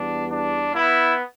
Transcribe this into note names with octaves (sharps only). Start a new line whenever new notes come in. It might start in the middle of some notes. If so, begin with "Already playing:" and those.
Already playing: E2 E3 G3 B3 D4
D4
B3 E4